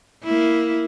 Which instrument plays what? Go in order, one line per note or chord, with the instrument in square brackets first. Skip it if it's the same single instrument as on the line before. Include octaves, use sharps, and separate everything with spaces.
[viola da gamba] A#3 E4